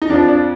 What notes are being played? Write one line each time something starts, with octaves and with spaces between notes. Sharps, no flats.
D#4
F2 F3 D4
D4